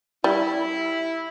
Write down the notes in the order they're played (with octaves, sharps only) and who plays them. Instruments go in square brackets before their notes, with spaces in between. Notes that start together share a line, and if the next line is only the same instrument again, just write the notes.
[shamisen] G3 [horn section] E4